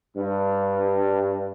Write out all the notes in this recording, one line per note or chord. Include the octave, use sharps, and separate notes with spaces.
G2